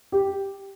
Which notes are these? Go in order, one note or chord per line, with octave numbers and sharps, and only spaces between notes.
G4